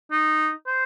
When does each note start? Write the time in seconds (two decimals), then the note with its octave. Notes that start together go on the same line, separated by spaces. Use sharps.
0.12 D#4
0.67 C5